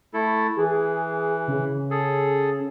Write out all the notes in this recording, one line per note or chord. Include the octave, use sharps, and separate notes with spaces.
A3 E4 A4
E3 G#4
C#3
G#4 A4